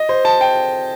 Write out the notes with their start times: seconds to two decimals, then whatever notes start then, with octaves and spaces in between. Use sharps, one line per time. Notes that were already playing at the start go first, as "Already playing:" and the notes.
Already playing: D#5
0.09 C5
0.25 A5
0.41 G5